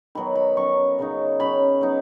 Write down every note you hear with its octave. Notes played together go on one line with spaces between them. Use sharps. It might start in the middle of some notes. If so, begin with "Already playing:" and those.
D#3 F#3 B3 B5
B5
F#3 C#4 C#6
C#3 F#3 D#4
F#3 C#4 B5
F#3 B3 D#4